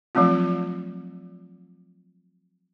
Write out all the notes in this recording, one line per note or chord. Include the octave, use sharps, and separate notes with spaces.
F3 F#3 A3 C4 F4